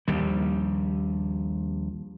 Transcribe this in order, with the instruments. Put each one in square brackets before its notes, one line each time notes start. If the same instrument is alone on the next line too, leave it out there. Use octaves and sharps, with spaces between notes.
[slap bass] A#1 D#2 G3